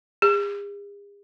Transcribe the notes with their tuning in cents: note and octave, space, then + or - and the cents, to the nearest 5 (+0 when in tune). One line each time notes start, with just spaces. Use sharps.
G#4 -45